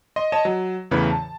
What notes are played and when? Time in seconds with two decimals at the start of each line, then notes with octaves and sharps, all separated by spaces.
0.16 D#5 C6
0.32 C#5 D#5 A5 E7
0.45 F#3
0.91 E2 A2 C#3 E3 B4 C#5
1.10 A5